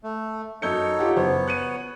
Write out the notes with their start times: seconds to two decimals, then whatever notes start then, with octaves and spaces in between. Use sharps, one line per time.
0.03 A3
0.62 F#2 D#4 A4 C#5 G6 C#7
0.99 F4 G4 F#5
1.16 F#1 B3 C5 C#5
1.47 F#6 C#7 D#7